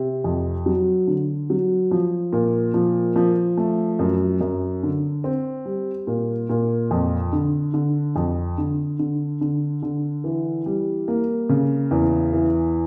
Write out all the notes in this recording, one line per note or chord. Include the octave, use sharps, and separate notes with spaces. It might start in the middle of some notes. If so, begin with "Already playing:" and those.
Already playing: C3
F2
F#3
D3
F#3
F3
A#2
F3
F3
A3
F#2
F#2
D3
C4
G3
A#2
A#2
F2
D3
D3
F2
D3
D3
D3
D3
E3
G3
A#3
C#3
E2
E3